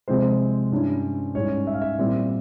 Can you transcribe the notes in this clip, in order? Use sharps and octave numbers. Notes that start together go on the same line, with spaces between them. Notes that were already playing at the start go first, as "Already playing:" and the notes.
C3 F3 G#3 C4 C5
G2 G3 C#4 E4
G#2 G3 C#4 E4 C#5
E5
F5
E5
A#2 G3 C4 E4